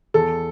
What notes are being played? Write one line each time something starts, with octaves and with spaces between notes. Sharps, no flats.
E2 A4